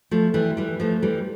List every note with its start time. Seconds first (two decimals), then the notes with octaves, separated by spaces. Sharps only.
0.11 F3 A3
0.34 E3 G3
0.57 E3 G3
0.80 F3 A3
1.02 E3 G3